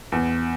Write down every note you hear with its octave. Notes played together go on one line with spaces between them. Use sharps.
E2